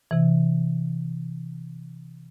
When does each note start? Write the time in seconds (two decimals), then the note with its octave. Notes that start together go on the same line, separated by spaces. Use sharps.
0.11 C3 E3